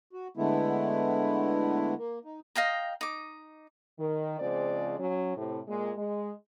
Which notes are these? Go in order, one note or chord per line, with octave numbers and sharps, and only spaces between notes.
F#4
D3 G#3 A3 B3 E4
A#3
D#4
D#5 F5 G5 A#5
D#4 D6
D#3
C#3 F3 G#3 C4 D5
F#3 C#4
A2 C3
A#2 G#3
G#3